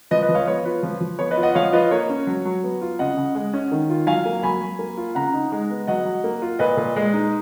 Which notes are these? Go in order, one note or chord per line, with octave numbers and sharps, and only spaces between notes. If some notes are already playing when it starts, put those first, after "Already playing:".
F3 B4 D#5
B4 D#5
F3
C#5 F5
B3 C#5
F4 B4
F3
F3
B3 C#5
B4 D#5
F4
D#5 F#5
F3 C#5 F5
F4 B4 D#5
A#3 C#5
C#4
F#3
F#3
B3
F4
C#3 D#5 F#5
C#3
G#3
C#4
D#3
F4
F#3 F5 G#5
A#3
F#3 G#5 B5
F#3
A#3
F4
C#3 F#5 A#5
D#4
G#3
B3
F#3 D#5 F#5
F#3
A#3
F4
A#2 B4 D#5
A#2
G#3
D#4